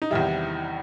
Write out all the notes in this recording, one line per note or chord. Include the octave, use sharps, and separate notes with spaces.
D#4
E2 C3 D#3 G3 E4